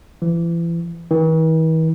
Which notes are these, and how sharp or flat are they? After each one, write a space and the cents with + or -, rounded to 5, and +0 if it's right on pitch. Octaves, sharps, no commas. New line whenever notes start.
E3 +35
E3 -45